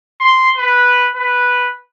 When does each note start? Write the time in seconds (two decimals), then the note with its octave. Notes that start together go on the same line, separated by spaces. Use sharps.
0.21 C6
0.57 B4
1.16 B4